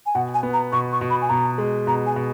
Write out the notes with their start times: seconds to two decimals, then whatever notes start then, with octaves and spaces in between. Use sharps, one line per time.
0.06 G#5
0.15 B2 F#5
0.34 G#5
0.43 B3
0.53 A#5
0.72 B2 C#6
0.92 C#6
1.01 B2
1.10 B5
1.22 G#5
1.29 B2 A#5
1.58 G#3
1.87 B2 A#5
2.06 G#5
2.16 B2